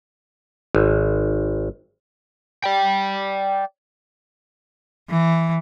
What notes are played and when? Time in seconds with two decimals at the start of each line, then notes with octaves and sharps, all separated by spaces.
0.75 G#1
2.64 D5 G5
5.10 E3